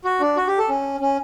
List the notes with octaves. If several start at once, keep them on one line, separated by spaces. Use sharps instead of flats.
F#4
D4
F#4
G4
A4
C#4
C#4